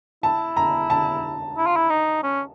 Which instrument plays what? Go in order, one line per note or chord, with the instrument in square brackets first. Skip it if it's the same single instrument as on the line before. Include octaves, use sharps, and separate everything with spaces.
[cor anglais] E4 [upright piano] A5
[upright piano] A#5
A5
[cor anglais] E4
F4
E4
D#4
C#4